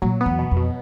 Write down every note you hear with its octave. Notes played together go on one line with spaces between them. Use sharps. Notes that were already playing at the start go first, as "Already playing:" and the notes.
A#2 F#3
B3
E2
B2
F2
B2